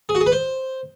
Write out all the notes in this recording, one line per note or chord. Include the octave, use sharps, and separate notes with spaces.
G#4
F#4
G#4
B4
C5